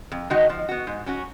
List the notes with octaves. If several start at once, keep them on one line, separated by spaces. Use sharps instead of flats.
F2
D#3 G#3 D#4 F#4
F3
B3 F#4
G#2
F#3 C#4 F#4